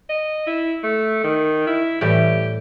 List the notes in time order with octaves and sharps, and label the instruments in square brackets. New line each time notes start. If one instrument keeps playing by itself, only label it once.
[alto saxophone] D#5
E4
A3
D#3
E4
[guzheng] A2 E3 G3 [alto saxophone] G4